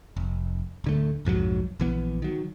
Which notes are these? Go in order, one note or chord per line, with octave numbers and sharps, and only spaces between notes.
F1
D1 D3 A3
B1 F2 G#2 F#3
A#1 E3 B3
D#3 F#3